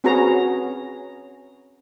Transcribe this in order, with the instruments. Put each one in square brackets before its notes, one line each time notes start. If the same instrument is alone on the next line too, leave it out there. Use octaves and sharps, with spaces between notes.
[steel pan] C4 C#4 F#4 G#4 B4 A#5